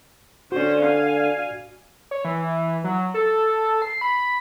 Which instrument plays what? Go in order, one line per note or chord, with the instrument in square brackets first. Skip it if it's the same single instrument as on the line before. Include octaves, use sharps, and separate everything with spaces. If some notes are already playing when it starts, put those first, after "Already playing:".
[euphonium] D3 [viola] C#4 C5 [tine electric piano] F#4 D5
[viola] F5 G#5
[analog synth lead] C#5
E3
F#3
A4
C7
B5